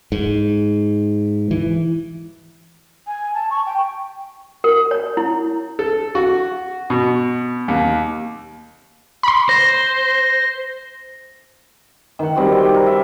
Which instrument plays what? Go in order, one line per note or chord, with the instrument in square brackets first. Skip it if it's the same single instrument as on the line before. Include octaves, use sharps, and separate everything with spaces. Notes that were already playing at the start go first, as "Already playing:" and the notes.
[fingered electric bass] G#2
E3
[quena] G#5
A5
C#6
G5
[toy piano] A#4
C#5
E4
[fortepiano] A4
F#4
B2
D#2
[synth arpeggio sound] B5 C6
[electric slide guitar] C5 [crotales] A#6
[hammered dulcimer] D#3 F#5
G3 C4 D#4 F#4
D5 G5
A#4
E5